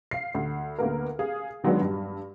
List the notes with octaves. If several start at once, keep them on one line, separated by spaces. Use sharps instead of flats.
F5 C7
D2
D2 A#3 B3 A#4
G#4 F5
D#3 F#3 G#3 B3 D4 F#4
G2